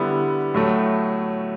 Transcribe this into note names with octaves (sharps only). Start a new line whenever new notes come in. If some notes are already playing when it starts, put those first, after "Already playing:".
Already playing: D3 G3 B3 E4 G4
A2 F#3 A3